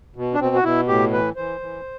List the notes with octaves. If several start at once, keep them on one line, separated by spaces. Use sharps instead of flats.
B2
D4
B2 C4
F#4
B2 E4
A2 G4
E3 B4
E3 C5
E3